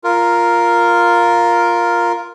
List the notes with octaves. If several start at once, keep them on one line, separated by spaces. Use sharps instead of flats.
F4 A#4